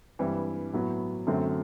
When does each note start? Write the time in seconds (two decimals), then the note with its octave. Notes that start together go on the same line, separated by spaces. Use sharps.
0.19 G2 E3 G3 C4 E4
0.73 A2 F#3 B3
1.27 F#2 D3 F#3 A3 C4